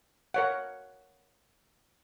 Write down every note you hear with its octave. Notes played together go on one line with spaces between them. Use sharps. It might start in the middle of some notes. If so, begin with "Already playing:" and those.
A#4 C#5 F#5